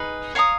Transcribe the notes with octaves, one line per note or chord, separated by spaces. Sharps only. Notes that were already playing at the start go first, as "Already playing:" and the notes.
Already playing: D#4 G#4 B4
C#5 F5 A#5 D#6